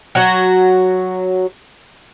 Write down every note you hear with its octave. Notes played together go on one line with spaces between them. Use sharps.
F#3 F#4